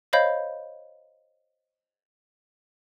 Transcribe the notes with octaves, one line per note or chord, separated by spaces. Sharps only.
C5 C#5 D#5 F5 B5 G6